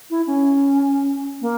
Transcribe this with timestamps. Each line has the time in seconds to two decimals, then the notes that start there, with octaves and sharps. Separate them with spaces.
0.10 E4
0.26 C#4
1.41 A#3